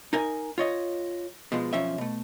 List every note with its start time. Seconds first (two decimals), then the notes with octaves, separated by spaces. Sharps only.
0.13 D#4 A#4 G#5
0.58 F4 C#5 D#5
1.52 B2 F3 G#3
1.73 B1 F2 F3 C#4 E5
1.98 B2 A3